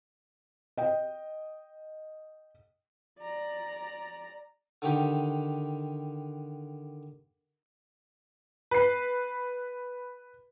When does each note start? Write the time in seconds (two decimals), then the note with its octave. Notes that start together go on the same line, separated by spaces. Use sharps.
0.77 D#5 G5
3.19 D5 A#5
4.82 D3 D#3 G4
8.71 B4 C7